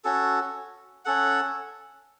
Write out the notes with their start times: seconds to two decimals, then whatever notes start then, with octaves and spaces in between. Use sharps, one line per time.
0.05 C#4 F#4 A4
1.05 C#4 A4 F#5